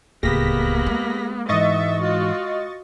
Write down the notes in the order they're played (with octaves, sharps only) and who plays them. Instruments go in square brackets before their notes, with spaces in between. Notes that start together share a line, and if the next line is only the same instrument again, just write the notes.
[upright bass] D1 C#2 [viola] A#3 B3 [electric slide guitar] G4 G#4 [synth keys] A#6 B6
[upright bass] G#3
[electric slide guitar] G#2 E3 [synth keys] D#5 C#6 A6 [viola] E5
[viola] F4 F#4